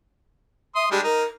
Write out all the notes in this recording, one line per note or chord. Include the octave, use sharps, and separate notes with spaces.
E5 C6 D#6
G3 G#3 D4 G4
D#4 A#4